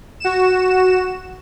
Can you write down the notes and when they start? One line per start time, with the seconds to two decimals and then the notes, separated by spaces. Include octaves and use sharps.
0.20 F#4 E7